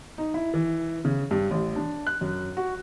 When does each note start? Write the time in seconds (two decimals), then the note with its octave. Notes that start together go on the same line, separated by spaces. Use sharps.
0.18 D#4
0.34 E4
0.54 E3
1.05 C#3
1.31 G2
1.51 A1
1.76 D4
2.07 F#6
2.21 F#2
2.57 F#4